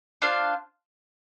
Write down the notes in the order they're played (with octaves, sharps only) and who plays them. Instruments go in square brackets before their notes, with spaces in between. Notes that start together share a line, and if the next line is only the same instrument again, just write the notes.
[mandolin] D4 F4 C5 F5